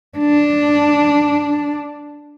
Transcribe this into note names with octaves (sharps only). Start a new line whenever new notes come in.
D4